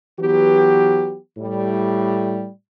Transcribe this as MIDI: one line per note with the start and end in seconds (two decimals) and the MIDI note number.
0.20 1.16 52
0.20 1.16 54
0.20 1.16 59
0.20 1.16 67
1.38 2.48 45
1.38 2.48 55